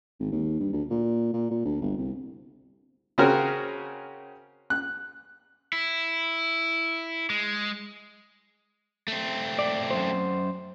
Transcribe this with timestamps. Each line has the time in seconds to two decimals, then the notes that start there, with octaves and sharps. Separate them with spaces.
0.20 G#1
0.32 D#2
0.60 G2
0.73 D2
0.90 A#2
1.33 A#2
1.51 A#2
1.65 D2
1.82 G1
1.97 C2
3.18 C#3 C4 C#4 F#4 A#4
4.70 F#6
5.73 E4
7.30 G#3
9.08 A3 C4
9.59 D5
9.91 F#2 E3 C5